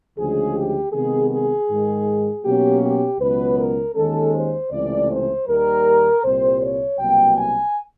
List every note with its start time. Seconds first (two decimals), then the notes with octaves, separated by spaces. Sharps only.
0.17 D2 C#3 F3 G#3 G#4
0.55 G4
0.93 C3 D#3 G#3 B3 G#4
1.31 G#4
1.68 G#2 D#3 G#3
2.44 B2 F#3 A#3 C#4 G4
2.83 G4
3.20 C#2 B2 F#3 B3 B4
3.58 A#4
3.96 D#2 D#3 G#3 C#4 A4
4.35 C5
4.71 C#2 C3 E3 A3 D5
5.10 C5
5.47 D#2 D#3 G3 A#4
6.23 C2 A#2 G3 C4 C5
6.62 C#5
6.99 C2 B2 F#3 A#3 G5
7.38 G#5